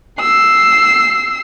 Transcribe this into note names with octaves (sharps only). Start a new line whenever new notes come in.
E6 C7